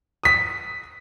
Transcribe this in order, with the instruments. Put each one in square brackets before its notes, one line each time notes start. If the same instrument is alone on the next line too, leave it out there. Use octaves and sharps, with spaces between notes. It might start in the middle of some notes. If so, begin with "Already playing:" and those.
[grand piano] D#6 B6